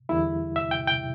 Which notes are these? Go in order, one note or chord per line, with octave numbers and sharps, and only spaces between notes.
E2 D3 G3 E4
E5
G5
G5